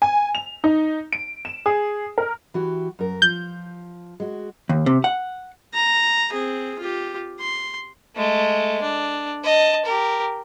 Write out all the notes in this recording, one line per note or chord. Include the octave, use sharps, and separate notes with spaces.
G#5
F7
D#4
D7
E7
G#4
A#4
E3 F#4 G4
F#2 A#4
F3 G6
G#3 F#4
D#2
C3
F#5
A#5
C4 G#4
F4 G4
C6
G#3 A3
D4
D#5 A5
G4 A#4